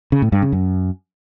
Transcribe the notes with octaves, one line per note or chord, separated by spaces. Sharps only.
C#3
A2
G2
C#3
F#2